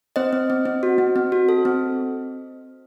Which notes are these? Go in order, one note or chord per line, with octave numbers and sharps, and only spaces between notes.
C4 C5 D#5
C4
C4
C4
F#4
C4
C4
F#4
A4
C4